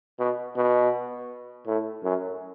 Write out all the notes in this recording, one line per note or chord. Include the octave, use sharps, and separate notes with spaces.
B2
B2
A2
F#2